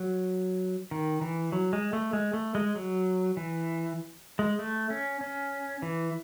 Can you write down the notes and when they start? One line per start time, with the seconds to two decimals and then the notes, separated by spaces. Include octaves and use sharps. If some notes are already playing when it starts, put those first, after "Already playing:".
Already playing: F#3
0.91 D#3
1.21 E3
1.52 F#3
1.73 G#3
1.93 A3
2.13 G#3
2.33 A3
2.55 G#3
2.76 F#3
3.37 E3
4.39 G#3
4.59 A3
4.90 C#4
5.21 C#4
5.82 E3